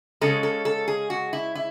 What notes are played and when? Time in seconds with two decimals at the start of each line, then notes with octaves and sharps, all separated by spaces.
0.21 C#3 G#3 C#4 A4
0.43 A4
0.65 A4
0.88 G#4
1.10 F#4
1.33 E4
1.55 E4